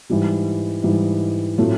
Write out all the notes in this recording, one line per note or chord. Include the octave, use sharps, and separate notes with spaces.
G#2 E3 G3
G#2 E3 G3
A2 F#3 A3 C4 F4